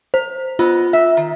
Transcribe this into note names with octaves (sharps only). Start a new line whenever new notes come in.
C5
B3 F4
E5
D#3